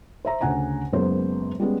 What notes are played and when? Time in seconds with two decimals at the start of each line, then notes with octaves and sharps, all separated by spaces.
0.25 C5 E5 A#5
0.41 D2 C#3 C#4 F#5 G#5 A#5
0.93 F#1 F#2 G#3 B3 C5
1.60 G3 G#3 B3 C#4